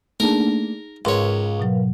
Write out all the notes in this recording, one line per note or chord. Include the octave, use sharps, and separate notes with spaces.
A3 A#3 D4 D#4 G#4 A#4 A5
C#2 G#2 A#4 B4 C#5 F5 C6
B2 F#3